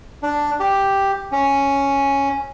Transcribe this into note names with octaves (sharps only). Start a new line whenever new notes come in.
D4
G4
C#4